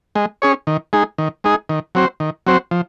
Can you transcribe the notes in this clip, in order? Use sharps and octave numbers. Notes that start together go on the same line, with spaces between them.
G#3
C#4 G#4 C#5
D#3
G#3 D#4 G#4
D#3
G#3 D#4 G#4
D#3
F#3 C4 F#4 C5
D#3
F#3 C4 F#4 C5
F3